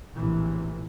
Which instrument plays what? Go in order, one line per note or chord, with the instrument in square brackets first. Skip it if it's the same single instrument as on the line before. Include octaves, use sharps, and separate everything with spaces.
[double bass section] A#1 A2 C3 E3